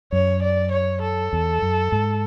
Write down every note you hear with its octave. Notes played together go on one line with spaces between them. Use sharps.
F#2 C#5
D5
C#5
A4
E2
F#2
G#2